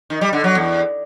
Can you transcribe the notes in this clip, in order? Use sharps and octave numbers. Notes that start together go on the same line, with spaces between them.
D#3
G3
D3
F#3
E2